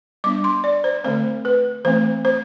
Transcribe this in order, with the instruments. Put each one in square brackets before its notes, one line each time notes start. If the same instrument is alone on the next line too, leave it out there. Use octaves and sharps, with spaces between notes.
[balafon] G3 B3 D4 D6
C6
D5
C5
D3 A3 C4 C5
B4
E3 A3 C4 C5
C5